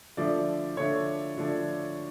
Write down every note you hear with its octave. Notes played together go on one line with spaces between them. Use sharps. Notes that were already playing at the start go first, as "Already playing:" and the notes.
D3 F3 A3 D4 D5
D3 F3 A3 D4 C#5
D3 F3 A3 D4